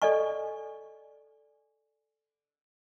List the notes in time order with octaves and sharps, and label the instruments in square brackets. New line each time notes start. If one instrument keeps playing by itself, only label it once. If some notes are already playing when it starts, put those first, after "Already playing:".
[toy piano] A4 D5 D#5 G#5 C#6